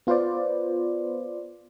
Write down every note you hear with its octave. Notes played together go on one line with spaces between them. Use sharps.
B3 F4 B4 C5 D5